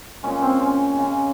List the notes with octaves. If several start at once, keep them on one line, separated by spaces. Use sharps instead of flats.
A#2 G#3 C#4
C4
C#4
C#3 G#3